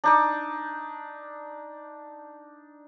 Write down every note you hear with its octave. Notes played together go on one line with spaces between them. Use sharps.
D4 D#4 D5